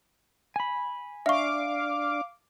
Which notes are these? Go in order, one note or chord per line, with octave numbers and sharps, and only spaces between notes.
G#5 B5
D4 D5 E5 F5 C#6 D6